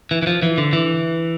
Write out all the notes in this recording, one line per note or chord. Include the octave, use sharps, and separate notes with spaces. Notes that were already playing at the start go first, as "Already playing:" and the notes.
E3
E3
F3
E3
D3
E3